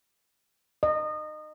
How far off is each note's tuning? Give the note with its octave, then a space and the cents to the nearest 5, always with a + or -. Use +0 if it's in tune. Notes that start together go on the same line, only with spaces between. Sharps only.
D#5 -25